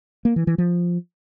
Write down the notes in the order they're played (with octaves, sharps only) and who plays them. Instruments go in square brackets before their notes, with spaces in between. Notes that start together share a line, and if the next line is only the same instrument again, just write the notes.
[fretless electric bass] A#3
E3
E3
F3